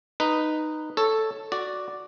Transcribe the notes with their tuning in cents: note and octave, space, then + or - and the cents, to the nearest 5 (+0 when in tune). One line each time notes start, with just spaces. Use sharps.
D#4 -10 B4 +0
A4 +0 C#5 +0
F#4 +0 D5 +0